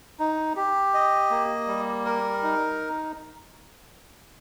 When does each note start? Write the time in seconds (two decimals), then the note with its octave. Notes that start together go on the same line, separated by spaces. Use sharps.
0.19 D#4
0.56 G4
0.94 D#5
1.30 A#3
1.67 G3
2.05 A#4
2.42 D#4